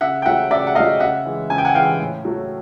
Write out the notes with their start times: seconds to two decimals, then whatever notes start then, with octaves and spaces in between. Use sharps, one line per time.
0.01 C#3 E5 F#5
0.22 G5
0.26 F#3 A3 E5 F#5
0.50 C#3 D5 E5
0.67 F#5
0.75 F#3 A3 D#5 F5
1.00 C#3 E5 F#5
1.25 E3 G#3
1.50 C#3 G#5
1.58 G5
1.65 F#5 G#5
1.75 E3 G#3 F5 G5
2.00 A2
2.25 F#3 A3